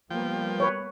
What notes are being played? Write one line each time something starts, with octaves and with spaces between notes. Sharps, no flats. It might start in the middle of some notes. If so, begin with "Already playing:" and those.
F3 G3 A#3 B3 G5
B4 C#5